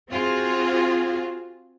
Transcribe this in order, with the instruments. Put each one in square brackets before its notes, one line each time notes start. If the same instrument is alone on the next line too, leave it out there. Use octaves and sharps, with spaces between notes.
[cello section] C4 F4 F#4 G#4